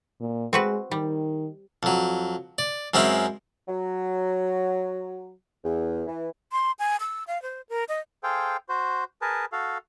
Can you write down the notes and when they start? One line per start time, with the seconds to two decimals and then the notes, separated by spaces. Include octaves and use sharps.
0.20 A#2
0.53 G#3 C4 F#4 B4
0.91 D#3 G3
1.83 F2 F#3
2.58 D5
2.94 F#2 G#3 C4 C#4 E4
3.68 F#3
5.64 E2
6.07 E3
6.52 C6
6.79 G#5
7.00 E6
7.27 F5
7.42 C5
7.69 A#4
7.89 D#5
8.23 G#4 A4 C5 F5 G5
8.69 F#4 C5
9.22 G#4 A#4 B4 A5
9.52 F#4 A4 F5